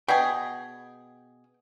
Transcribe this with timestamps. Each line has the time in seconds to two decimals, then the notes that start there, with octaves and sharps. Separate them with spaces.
0.08 B2 G#4 G5